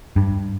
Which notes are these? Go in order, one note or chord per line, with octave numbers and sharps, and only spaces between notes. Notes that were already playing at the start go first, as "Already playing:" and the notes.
G2